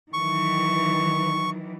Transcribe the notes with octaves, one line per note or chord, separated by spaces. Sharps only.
D#3 E3 F#3 C#6